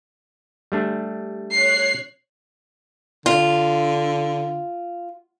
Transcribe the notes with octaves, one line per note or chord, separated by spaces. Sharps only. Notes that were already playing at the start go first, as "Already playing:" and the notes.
G3 A3 D4
C#5 F#6 C7
D3 F4